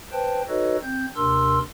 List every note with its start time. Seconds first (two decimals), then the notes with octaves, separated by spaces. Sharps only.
0.12 B4 C5 G5 A5
0.48 D#4 F#4 A4 B4 C#5 D#5
0.82 C4 G6
1.16 D#2 C3 D4 A#4 C6 E6